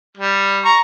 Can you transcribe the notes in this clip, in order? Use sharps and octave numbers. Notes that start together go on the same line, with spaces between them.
G3
A#5 C#6